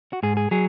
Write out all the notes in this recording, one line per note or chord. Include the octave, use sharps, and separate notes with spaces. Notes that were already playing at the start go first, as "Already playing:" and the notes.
F#4
G#2 G#4
G#4
F#3 G#4